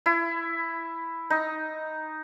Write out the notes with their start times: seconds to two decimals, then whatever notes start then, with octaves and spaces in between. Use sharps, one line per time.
0.06 E4
1.30 D#4